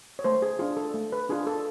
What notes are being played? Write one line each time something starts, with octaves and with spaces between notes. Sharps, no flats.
C#5
A3 C5
G#4
D4 F4 G#4
A4
A3
B4
D4 F4 G#4
A4